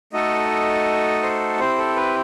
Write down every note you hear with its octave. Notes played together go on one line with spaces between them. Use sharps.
A3 D#4 F#4 A4 D#5
C5
C4 E4 G4 C5
A4
B4